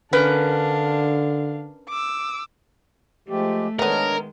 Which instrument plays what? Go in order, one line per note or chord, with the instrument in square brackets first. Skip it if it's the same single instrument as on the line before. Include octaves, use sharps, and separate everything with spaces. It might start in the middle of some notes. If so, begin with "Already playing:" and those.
[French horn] D3 [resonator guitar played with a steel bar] C#4 A#4 B4 [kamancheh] D4 F5
[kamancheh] D6 E6
[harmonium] F3 G#3 G4 [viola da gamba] A3
[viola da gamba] D#3 G#3 [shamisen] A3 B3 [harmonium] D4 C#5 D#5 [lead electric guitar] A#4